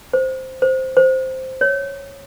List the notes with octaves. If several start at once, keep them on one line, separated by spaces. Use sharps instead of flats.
C5
C5
C5
C#5